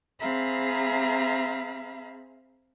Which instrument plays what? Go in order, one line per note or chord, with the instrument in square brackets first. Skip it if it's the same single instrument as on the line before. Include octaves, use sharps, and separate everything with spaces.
[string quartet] C4 G#4 E5 F5 A#5 B5